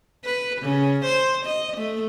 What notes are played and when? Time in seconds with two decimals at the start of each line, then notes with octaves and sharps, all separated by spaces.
0.24 B4
0.61 C#3
1.05 C5
1.46 D#5
1.77 A3